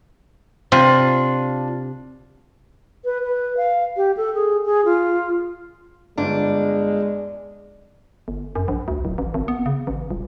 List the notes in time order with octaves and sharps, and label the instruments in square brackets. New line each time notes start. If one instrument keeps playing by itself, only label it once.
[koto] C3 [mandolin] D4 F4
[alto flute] B4
B4
F5
G4
A4
G#4
G#4
F4
[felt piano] G1 [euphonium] G#3 [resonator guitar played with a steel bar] D4
[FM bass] G1
F#2
A#1
D2
D1
A1
G#1
B3
C#3
A1
D#1